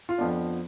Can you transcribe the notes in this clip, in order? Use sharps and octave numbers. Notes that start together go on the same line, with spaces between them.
F4
F2 F3 B3 D4